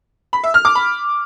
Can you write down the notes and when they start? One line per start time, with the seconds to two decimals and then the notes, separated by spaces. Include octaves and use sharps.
0.33 B5
0.44 E5
0.54 F6
0.65 D6
0.75 B5